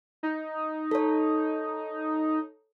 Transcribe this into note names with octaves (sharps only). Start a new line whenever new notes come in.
D#4
A4 C#5